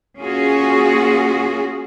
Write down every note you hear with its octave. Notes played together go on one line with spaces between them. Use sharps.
A#3 C#4 F4 F#4 G#4